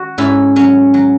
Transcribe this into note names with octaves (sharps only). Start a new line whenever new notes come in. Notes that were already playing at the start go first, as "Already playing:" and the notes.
Already playing: F#4
G#2 C#4 E4
F#3 C#4
F#3